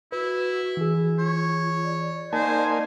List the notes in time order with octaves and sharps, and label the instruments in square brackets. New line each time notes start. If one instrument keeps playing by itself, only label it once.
[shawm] E4 [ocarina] F#4 [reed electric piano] B4
[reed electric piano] E3 G#4
[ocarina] F4 [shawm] C#5
[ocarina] D5
[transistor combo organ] A#3 D#4 G#5 [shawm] C5 [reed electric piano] A5